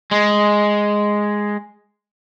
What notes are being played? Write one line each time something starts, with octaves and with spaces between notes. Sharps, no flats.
G#3